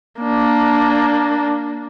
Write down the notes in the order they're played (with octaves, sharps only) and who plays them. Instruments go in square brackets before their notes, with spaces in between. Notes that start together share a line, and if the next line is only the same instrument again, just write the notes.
[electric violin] A#3 D4